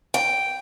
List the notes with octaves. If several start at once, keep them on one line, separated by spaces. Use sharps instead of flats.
G5